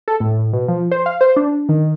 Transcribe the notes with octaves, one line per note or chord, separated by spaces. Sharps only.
A4
A2
A2
B2
F3
C5
F5
C5
D4
D4
D#3